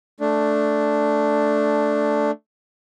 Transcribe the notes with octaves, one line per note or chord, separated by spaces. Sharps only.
A3 D4